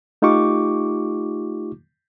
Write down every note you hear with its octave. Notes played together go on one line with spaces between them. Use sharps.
A3 D#4 F4 G4 C#6 D6